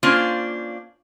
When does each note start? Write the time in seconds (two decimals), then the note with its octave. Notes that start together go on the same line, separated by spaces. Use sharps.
0.03 A#3 C#4 D4 F4 C5